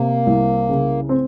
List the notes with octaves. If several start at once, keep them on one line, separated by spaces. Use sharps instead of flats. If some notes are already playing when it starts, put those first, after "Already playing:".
Already playing: C3 A#3
C2
C#3
C4